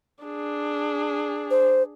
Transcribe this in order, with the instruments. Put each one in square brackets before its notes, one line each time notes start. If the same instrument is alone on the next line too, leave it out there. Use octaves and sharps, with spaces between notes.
[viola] D4 G#4
[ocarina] C5